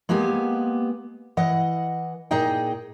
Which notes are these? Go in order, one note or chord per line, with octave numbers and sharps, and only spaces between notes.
G#3 A#3 B3 G4 G#5
E3 D#5 F#5
A#2 D#4 G#4 D#5 G5